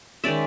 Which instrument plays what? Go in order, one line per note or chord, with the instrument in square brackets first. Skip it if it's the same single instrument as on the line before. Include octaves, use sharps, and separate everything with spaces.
[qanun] D#3 G#3 C#4 D5 E5